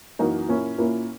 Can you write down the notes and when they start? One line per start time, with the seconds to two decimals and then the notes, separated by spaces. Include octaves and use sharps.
0.19 F#2 E3 A#3 D#4 F#4
0.48 A#2 A#3 C#4 E4
0.78 A#2 A#3 C#4 E4